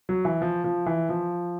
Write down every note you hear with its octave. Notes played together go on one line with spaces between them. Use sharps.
F#3
E3
F3
F3
E3
F3